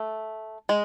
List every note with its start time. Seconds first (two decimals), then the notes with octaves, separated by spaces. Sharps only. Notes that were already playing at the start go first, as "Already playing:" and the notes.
Already playing: A3
0.69 G#3